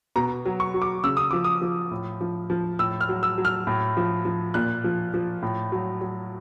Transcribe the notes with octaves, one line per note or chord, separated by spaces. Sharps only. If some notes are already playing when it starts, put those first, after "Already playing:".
B2 A#5
F#3
C#6
F#3
D6
C#3 E6
D#6
F3 D6
D#6
F3
A2
F3
F3
A2 E6
F6
F#3
E6
F#3
F6
A2
F3
F3
A#2 F#6
F3
F3
A2
F#3
F#3